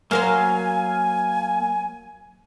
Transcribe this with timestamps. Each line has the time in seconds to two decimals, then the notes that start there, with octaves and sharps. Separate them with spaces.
0.11 F#3 A#3 A#4 C5 F5 G#5